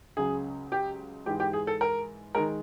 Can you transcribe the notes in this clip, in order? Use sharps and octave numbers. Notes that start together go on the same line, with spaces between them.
C#2 C#3 F#3 G#4
G4
G#2 E3 G#3 G4
G4
G#4
A4
A#4
D#3 G#3 A#4